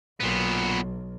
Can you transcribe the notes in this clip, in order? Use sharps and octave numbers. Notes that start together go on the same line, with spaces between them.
B1 A#2 B3